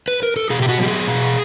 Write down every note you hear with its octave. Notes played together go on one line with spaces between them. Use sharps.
B4
A#4
A4
B2 G#4
G4
F#4
F#3 B3 G4
G#4
B2